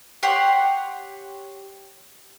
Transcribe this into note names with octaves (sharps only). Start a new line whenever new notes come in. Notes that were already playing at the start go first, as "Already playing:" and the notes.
G4 C#5 F#5 C6